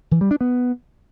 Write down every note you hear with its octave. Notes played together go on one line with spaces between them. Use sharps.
E3
G3
D4
B3